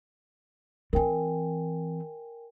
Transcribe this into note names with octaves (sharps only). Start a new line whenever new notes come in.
E3 C4 A#4 G5 G#5